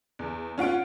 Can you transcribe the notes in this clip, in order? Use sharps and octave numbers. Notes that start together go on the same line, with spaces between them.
E2
C#4 F4 F#5 D7